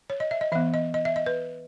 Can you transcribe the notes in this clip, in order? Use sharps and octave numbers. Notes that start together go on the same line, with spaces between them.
C#5
D#5
E5
D#5
E3 B3 E5
D#5
D#5
E5
D#5
B4